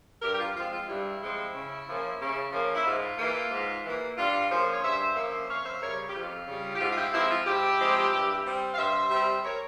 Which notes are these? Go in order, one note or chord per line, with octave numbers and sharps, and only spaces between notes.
G2 G4 A#4
G4
F4
F3 G#3 C4 F4
F4
G2 E4
F3 G#3 C4
C#3
F3 A#3 C#4
C#3
F3 A#3 C#4
E4
G#2 F4
E3 A#3
G#2
E3 A#3
G2 F4
F3 A#3 C#4 G#4 C5
C#5
G2 C5 E5
F3 A#3 C#4 C5 E5
F2 C#5 F5
C5 E5
C#3 G3 A#4 C#5
G4
F2 F4
C#3 G3
G4
G#2 F4
F4
E4 G4
F3 G#3 C4 E4
F4
G#2 E4 G4
F3 G#3 C4
G2
G3 C4
F5
G2 C5 E5
G3 C4
A#4 C#5